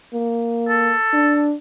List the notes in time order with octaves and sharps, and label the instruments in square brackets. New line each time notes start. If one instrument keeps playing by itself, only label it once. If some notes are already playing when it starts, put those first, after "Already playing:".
[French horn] A#3
[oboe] A4
[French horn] D4